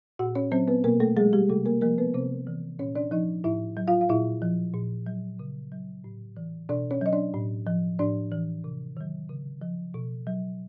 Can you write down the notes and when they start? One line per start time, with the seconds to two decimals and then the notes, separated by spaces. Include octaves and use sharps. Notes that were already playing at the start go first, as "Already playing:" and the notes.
0.19 A#2 F#4 F#5
0.35 C#4 C#5
0.52 F#3 C4 C5
0.68 B3 B4
0.84 B2 A#3 A#4
1.00 A3 A4
1.17 F#3 G#3 G#4
1.33 G3 G4
1.50 C3 A3 A4
1.66 A#3 A#4
1.81 F3 A#3 A#4
1.98 B3 B4
2.14 C3 C4 C5
2.47 E3
2.79 A#2 C#4 C#5
2.96 D4 D5
3.11 F3 D#4 D#5
3.44 A2 E4 E5
3.77 F#3
3.88 F4 F5
4.01 F5
4.09 A#2 E4 E5
4.42 F3
4.74 A#2
5.07 F#3
5.39 C#3
5.72 F#3
6.04 A2
6.37 E3
6.69 B2 D4 D5
6.91 C#4 C#5
7.01 F#3 D#5
7.13 D4 D5
7.34 A2
7.67 F3
7.99 A2 D4 D5
8.32 E3
8.64 C3
8.97 D#3 F#3
9.29 C#3
9.62 F3
9.94 B2
10.27 F#3